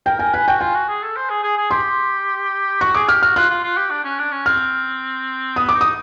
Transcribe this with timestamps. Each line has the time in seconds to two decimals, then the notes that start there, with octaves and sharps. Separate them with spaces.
0.06 A#4 G5
0.19 A#4 G#5
0.33 B4 G#5
0.48 F#4 G5
0.60 F4 G#5
0.75 F#4
0.88 G#4
1.02 A4
1.17 C5
1.30 G#4
1.43 G#4
1.57 G#4
1.71 G4 C6
2.81 F#4 C#6
2.95 G#4 D6
3.08 G4 F6
3.23 F#4 F6
3.36 F4 F#6
3.50 F4
3.63 F4
3.77 G4
3.91 D4
4.04 C#4
4.19 D4
4.32 C#4
4.46 C4 F6
5.56 B3 D#6
5.69 D6
5.74 D#4
5.81 D#6